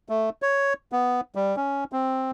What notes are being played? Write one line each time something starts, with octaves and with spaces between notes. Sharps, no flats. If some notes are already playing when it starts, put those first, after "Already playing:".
A3
C#5
B3
G3
C#4
C4